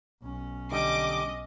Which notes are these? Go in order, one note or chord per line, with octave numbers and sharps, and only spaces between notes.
B1 C#4
D3 G3 D#5 D6